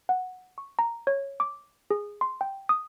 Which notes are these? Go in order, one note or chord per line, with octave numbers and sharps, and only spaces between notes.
F#5
C#6
A#5
C#5
D6
G#4
C6
G5
D#6